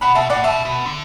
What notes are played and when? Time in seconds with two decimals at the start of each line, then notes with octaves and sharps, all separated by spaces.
0.01 B2 F#5 B5
0.15 B2 E5 A5
0.30 A2 D5 F#5
0.44 B2 E5 A5
0.65 B2
0.85 D3